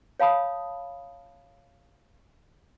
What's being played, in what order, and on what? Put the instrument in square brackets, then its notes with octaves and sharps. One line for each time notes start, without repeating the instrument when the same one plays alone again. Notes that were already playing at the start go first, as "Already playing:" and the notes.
[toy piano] C#5 F5 A5 B5 D#6